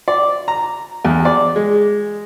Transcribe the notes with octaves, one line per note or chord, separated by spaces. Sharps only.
D5
A#5
E2
D5
G#3